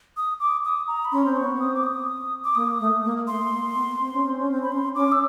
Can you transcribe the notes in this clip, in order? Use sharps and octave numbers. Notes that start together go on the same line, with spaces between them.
D#6
D6
D#6
A#5
B5
C#4 C6
C4
B3 C#6
C4
D#6
D6
D#6
D6
A#3 D#6
A3
A#3
A3 C6
A#3
B3
C4
C#4
C4
C#4
C4
B5
C#4 C6
C#4 D6
E6